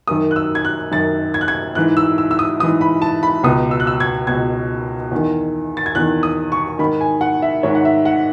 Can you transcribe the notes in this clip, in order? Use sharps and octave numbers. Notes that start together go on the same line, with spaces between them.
F#2 D#3 D#6
F#6
E6
G#6
F#6
F#2 D#3 A6
G#6
F#6
G#6
G#2 E3 F#6
E6
E6
E6
D#6
G#2 E3 D#6
B5
A5
B5
C#2 B2 D#6
E6
F#6
E6
G#6
C#2 B2 G#6
E2 D#3
A6
G#6
E2 D#3 F#6
D#6
C#6
G#2 D#3 B5
G#5
F#5
E5
G#2 D#3 C#5
F#5
E5
F#5